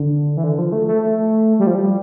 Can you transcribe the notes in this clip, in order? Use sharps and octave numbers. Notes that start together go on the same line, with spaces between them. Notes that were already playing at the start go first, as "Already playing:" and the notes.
Already playing: D3
E3
D3
F3
A3
A3
A3
G3
F3
G3